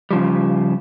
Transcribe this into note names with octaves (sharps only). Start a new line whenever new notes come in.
C#3 F3 G3